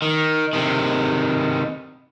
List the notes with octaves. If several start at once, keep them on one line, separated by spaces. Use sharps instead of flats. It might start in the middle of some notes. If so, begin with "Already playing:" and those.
D#3
C3 D#3